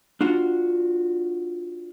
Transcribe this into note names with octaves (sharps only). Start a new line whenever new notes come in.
D4 F4 F#4